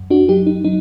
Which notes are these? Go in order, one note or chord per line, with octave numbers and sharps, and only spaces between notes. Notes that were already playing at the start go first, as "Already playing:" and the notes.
Already playing: F#2
D4 F#4
F#3 D#4 G4
D#4
F#3 D#4